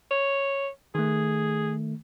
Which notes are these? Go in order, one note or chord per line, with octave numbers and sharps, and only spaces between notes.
C#5
D#3 A3 G#4